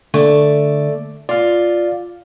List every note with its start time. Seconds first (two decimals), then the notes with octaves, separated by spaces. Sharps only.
0.14 D3 A3 D5
1.29 F4 D5 F5